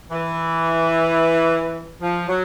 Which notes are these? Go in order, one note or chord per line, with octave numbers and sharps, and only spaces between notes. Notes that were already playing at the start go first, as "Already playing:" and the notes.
E3
F3
F#3